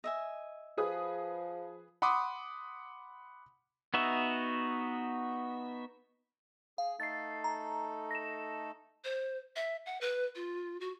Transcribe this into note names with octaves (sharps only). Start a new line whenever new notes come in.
D#5 E5 G#5
F3 G#4 B4 D#6
F#5 B5 C6 D6 D#6
B3 D#4 F#4 E5
G#4 F5
A3 D#4 A4 A6 C7
A#5
A#6 E7
C5
E5
F#5
B4
F4
F#4